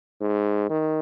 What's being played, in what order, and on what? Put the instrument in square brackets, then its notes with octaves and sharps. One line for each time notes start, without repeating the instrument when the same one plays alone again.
[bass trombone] G#2
D#3